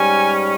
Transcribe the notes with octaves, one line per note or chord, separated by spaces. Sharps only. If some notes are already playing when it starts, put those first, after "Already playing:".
Already playing: G#2 G3 C#4 G#5